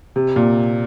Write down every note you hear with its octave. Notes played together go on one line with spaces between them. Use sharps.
C3
A#2